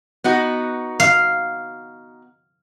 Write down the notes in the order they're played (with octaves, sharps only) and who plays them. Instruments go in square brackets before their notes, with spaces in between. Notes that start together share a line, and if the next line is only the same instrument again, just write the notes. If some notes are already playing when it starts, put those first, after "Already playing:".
[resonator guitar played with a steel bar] B3 D#4 F#4
[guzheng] F5